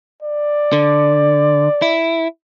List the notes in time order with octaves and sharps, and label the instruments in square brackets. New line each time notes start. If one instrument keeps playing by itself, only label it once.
[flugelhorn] D5
[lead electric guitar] D3
E4